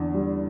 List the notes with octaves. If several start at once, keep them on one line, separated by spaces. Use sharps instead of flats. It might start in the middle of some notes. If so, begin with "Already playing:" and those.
Already playing: E2 D3 D4
G3